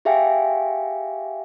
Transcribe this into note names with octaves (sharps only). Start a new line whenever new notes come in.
G4 G#4 E5 F5 G5 G#5